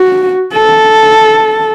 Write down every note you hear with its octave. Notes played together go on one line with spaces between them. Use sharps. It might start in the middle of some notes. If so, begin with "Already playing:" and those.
Already playing: F#4
A4